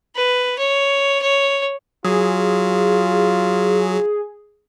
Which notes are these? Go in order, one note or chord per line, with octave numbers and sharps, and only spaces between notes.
B4
C#5
C#5
F#3 F4 G#4